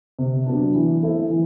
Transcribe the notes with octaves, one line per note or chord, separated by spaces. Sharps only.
C3
F#3 B3 D4
E3
A3 C4 E4
E3